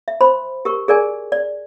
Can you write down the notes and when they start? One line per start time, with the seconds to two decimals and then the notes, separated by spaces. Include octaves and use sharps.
0.08 E5
0.21 C5 B5 C6
0.65 G4 A#4 C#6
0.88 G#4 A#4 D5 G#5
1.32 D5